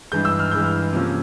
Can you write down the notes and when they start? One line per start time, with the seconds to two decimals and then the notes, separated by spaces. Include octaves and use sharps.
0.12 G2 E3 G#3 G6
0.25 E6
0.39 F6
0.51 G2 E3 G#3 G6
0.64 F6
0.93 C3 F3 A#3 C#4